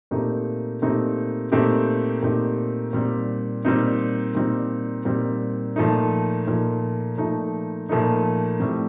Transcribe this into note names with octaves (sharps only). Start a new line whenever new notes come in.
A#2 A3 C4 D#4 G4
A#2 A3 C4 D#4 G4
A#2 A3 C4 D#4 G4
A#2 A3 C4 D#4 G4
A#2 G3 C4 D#4
A#2 G3 C4 D#4
A#2 G3 C4 D#4
A#2 G3 C4 D#4
A#2 F3 A3 D#4
A#2 F3 A3 D#4
A#2 F3 A3 D#4
A#2 F3 A3 D#4
A2 G3 C4